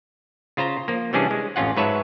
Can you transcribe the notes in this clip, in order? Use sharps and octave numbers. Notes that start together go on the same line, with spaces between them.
C#3 F4 C5 A#5
F3 A#3
C3 E3 G3 C#4 D4 G#4
G#3
A1 F2 C#4 F4 F#5
G#2 F#3 B4 C#5 E5 A5